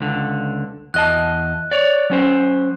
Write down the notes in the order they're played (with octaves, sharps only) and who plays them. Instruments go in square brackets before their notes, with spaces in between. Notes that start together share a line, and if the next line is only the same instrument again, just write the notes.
[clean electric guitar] C#2 D3
[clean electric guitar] E2 D#5 A5 [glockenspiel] F#6
[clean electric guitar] C#5 D5
F#3 C#4 C5